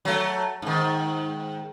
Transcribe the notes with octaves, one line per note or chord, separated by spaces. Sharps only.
F#3 A3
G#2 D#3